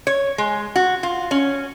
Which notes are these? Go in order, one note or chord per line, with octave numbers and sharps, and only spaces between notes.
C#5
G#3
F#4
F4
C#4